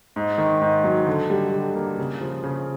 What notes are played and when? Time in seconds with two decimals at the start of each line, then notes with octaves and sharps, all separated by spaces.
0.16 G#2
0.38 D#3
0.61 G#2
0.84 F#3
1.07 D3
1.30 G3
1.53 D3
1.75 A#3
1.98 C#3
2.21 F3
2.43 C#3